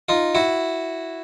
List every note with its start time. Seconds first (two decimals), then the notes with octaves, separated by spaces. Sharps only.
0.09 D#4 F4
0.35 E4 F#4